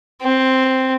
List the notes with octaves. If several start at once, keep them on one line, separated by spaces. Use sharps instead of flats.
C4